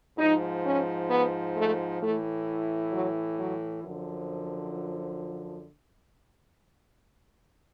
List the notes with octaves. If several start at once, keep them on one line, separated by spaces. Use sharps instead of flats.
G#2 F3 D#4
C#4
B3
A3
A2 E3 A3
F#3
F#3
F#2 D3 F3